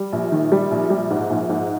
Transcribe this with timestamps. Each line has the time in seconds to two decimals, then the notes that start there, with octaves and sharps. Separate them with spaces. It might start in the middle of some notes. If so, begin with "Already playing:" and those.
Already playing: G3
0.12 A#1
0.32 D#3
0.52 G3
0.71 A#1
0.90 G3
1.10 G#2
1.30 A#1
1.49 G#2